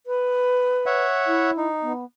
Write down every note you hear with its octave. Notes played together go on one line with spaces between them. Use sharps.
B4
C#5 E5 F#5
E4
D#4
B3